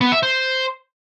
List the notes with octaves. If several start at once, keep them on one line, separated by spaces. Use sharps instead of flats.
B3
E5
C5